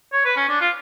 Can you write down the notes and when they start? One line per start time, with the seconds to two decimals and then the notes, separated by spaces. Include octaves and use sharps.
0.13 C#5
0.25 B4
0.37 C#4
0.49 D4
0.61 F4